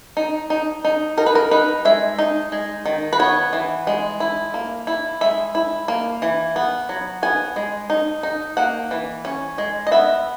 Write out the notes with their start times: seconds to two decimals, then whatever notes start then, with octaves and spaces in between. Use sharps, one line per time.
0.17 D#4
0.50 D#4
0.85 D#4
1.17 D#4 A#4
1.26 B4
1.35 A#4
1.51 D#4 B4
1.85 G#3 E5
2.19 D#4
2.52 G#3
2.86 D#3
3.13 B4
3.19 B3 C#5
3.53 E3
3.87 G#3
4.20 E4
4.54 A#3
4.87 E4
5.21 G#3 E5
5.55 E4
5.88 A#3
6.22 E3
6.56 B3
6.89 F#3
7.23 B3 G#5
7.56 G#3
7.90 D#4
8.23 D#4
8.57 A#3 F#5
8.91 E3
9.25 C#4
9.58 G#3
9.87 D#5
9.91 B3 E5